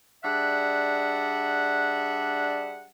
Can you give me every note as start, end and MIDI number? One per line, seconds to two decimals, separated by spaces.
0.24 2.86 55
0.24 2.86 62
0.24 2.86 68
0.24 2.86 76
0.24 2.86 78